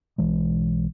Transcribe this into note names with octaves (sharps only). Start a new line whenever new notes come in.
B1 E3 G#3